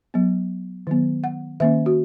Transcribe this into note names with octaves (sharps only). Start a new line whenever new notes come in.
F#3 B3
D#3 F#3 B3
F#5
D#3 A#3 C#4 E5
F#4